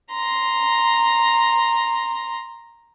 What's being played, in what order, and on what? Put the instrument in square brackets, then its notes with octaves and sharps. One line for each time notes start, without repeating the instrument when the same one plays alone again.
[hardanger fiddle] A#5 C6